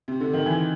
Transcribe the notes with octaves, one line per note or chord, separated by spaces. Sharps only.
C3
D3
D#3
E3